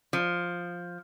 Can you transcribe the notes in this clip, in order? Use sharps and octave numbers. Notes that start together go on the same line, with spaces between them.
F3